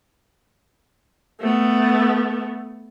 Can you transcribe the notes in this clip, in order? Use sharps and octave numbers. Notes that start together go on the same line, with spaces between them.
A3 B3